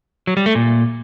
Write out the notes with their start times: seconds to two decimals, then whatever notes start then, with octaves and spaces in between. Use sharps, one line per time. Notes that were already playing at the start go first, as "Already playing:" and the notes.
0.27 F#3
0.37 G3
0.46 A3
0.55 A#2